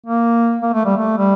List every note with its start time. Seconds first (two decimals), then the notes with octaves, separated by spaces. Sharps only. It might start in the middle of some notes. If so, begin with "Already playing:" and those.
0.06 A#3
0.62 A#3
0.74 A3
0.85 G3
0.97 A3
1.18 G3